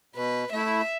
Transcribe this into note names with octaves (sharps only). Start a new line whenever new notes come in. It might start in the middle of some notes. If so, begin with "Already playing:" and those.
B2 B4
A3 E4 E5